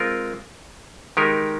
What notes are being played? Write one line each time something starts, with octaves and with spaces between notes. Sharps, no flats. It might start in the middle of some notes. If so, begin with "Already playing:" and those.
Already playing: G#3 C4 F4 A#4
D#3 G#3 D#4 G4 A#4